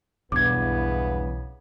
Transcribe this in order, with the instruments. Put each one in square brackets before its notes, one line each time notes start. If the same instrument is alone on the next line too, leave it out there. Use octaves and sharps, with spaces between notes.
[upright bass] B1 [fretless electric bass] E2 G2 [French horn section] C#3 B3 E4 [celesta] D6 G#6